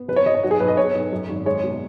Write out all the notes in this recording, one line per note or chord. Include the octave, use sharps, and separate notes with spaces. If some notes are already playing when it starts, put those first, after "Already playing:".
Already playing: B3
F#1 B4
C#5
F#1 D#5
C#5
B1 F#4
G#4
B1 B4
D#5
B3 C#5
B1
F#2
G#1
G#3 C#5
B2